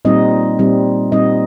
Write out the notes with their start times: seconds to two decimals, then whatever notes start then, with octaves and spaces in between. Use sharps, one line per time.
0.05 A#2 G3 C4 D#4 D#5
0.59 A#2 G3 C4 D#4
1.12 A#2 G3 C4 D#4 D#5